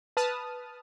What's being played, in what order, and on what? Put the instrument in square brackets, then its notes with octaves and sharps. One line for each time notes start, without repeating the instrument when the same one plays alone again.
[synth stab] B4 A5 D#6 F6